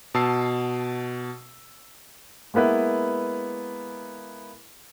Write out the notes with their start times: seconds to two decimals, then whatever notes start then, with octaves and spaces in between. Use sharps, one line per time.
0.14 B2 A5 E6 C7
2.54 G#3 A#3 B3 E4 B4